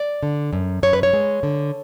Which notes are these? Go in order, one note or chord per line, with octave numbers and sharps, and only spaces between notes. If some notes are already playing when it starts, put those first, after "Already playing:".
Already playing: D5
D3
F#2
F#2 C#5
B4
C#5
G#3
D3